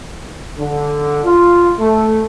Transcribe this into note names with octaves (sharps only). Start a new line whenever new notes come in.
D3
F4
A3